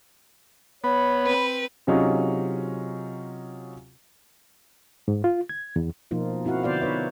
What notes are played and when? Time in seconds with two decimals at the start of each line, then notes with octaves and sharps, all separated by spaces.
0.84 B3 C#5 B5
1.22 C4 B4
1.87 C3 F#3 C#4 D#4 F4 G#4
5.08 G#2
5.24 F4
5.49 G#6
5.76 E2
6.11 B2 F3 A#3 D#4 F4
6.45 C4 E4 F#4 F5 F#5
6.63 D3 B3 C5 D5 F5
6.81 D#4 B4 C#5 E5